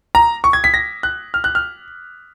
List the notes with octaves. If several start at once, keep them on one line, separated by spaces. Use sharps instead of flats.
A#5
C#6
G#6
B6
A#6
F#6
F6
F#6
F6